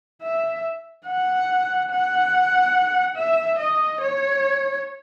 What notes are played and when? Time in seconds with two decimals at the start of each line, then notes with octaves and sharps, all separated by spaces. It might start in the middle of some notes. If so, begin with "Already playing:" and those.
0.22 E5
1.07 F#5
1.91 F#5
3.16 E5
3.59 D#5
4.01 C#5